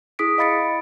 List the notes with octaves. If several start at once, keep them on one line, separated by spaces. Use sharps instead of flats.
E4 G#4 D#6 B6 D7
D#5 F5 B5 A6 C#7 D7